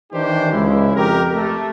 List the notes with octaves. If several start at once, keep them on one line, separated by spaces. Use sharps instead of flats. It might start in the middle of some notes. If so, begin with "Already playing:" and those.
D#3 E3 D4 E4 G4 C5
C#2 G#3 E4
F2 G4 A#4
A3